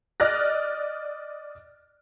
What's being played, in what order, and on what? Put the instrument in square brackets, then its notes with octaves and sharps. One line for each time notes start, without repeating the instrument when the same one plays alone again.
[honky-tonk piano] D5 D#5 F6 F#6 A#6